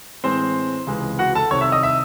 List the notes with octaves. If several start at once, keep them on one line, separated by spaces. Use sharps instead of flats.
A2 E3 G#3 C4 C5
C#2 C3 E3 G#3
F#4 F#5
A4 A5
C2 C3 D#3 C#5 C#6
E5 E6
D#5 D#6
E5 E6